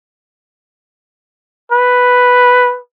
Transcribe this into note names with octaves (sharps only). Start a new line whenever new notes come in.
B4